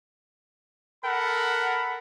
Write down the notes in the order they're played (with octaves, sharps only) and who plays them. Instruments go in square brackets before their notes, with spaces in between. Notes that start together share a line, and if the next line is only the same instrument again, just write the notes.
[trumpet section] A4 A#4 F#5 B5